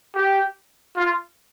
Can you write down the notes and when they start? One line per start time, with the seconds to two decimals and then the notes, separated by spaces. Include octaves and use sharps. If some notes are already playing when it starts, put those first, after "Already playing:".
0.15 G4
0.96 F4